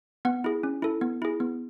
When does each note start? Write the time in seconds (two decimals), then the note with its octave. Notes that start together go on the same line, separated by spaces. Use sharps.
0.25 B3 F#5
0.44 E4 G#4
0.63 C#4
0.82 E4 A4
1.01 B3
1.22 E4 G#4
1.40 B3